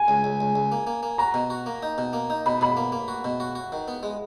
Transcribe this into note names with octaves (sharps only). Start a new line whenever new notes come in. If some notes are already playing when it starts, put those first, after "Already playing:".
Already playing: G#5
C#2
C#2
C#2
C#2
A#3
A#3
A#3
F#4 A#5
B2
F#4
A#3
D#4
B2
A#3
D#4
B2 B5
B2 B5
A#3
A#3
F#4
B2
F#4
F#4
D#3
B3
G#3